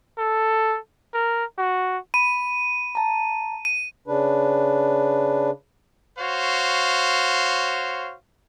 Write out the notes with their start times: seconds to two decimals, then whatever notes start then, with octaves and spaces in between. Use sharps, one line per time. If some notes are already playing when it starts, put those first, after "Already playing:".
0.18 A4
1.14 A#4
1.58 F#4
2.14 B5 D#7
2.95 A5 A#5
3.65 D#7
4.07 C#3 D4 B4
6.19 F#4 C5 C#5 F5